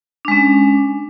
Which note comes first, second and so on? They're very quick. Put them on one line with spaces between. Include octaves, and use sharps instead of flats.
D4 G#3 C#4